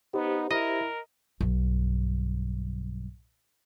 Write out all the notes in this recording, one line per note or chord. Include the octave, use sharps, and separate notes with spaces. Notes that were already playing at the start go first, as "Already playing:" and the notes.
B3 D#4 G4 C5
E4 A#4 D#5
B1 G2